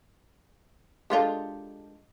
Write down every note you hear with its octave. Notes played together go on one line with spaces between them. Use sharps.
G#3 D4 F4 G4 A4 A#4